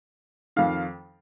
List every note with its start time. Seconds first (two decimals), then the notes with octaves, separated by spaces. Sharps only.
0.56 F2 D#3 F5